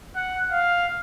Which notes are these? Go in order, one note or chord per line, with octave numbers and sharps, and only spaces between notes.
F#5
F5